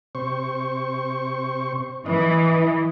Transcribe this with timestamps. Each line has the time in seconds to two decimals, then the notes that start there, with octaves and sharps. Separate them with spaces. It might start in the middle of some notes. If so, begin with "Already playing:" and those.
0.15 C3 C5 C#6
2.06 E3 D#5